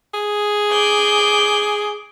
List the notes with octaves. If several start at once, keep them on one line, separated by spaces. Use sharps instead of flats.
G#4
D6 G6